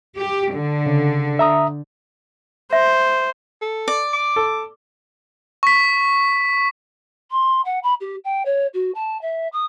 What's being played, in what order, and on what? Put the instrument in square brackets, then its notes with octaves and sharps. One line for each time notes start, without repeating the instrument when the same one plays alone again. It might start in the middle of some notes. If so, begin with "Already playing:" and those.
[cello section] G4
D3
[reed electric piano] C#3
E5 A#5 D#6
[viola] C5 [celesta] E5
[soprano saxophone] A4
[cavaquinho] D5
[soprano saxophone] D6
[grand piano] A4
[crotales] C#6 B6
[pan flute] C6
F#5
B5
G4
G5
C#5
F#4
A5
E5
D#6